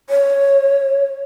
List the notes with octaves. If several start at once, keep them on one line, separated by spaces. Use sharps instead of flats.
C#5